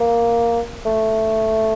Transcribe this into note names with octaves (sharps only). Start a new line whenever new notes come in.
A#3
A3